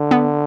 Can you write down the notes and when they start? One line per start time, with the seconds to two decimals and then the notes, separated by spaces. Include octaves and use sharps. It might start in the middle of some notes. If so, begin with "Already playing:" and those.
Already playing: D3
0.11 B3